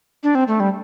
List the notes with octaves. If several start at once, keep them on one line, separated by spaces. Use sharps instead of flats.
D4
C4
A3
G3